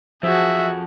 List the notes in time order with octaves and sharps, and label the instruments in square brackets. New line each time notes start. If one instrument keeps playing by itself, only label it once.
[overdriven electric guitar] F2 [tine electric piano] F3 [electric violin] F#4 G#4 [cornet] E5